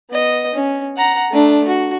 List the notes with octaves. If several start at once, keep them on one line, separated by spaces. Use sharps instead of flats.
B3 D#5
C#4
F#5 A#5
A3 D4
F#4